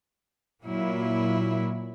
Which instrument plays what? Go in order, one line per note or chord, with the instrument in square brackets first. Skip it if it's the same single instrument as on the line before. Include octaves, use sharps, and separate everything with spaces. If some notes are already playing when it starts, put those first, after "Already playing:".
[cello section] A#2 F#3 E4